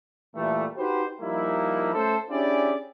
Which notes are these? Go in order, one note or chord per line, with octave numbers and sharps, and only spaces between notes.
A#2 E3 G3 A3
D#4 F#4 G4 B4 C5
F3 G3 A#3 D#4 E4
A3 C#4 A4 C5
C#4 D4 E4 G4 G#4 D5